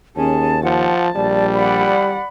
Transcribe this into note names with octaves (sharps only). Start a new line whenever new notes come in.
D#2 C#4 G#4 A5
F3 F#5 A5
A#1 G3 D5
D5 F#5 B5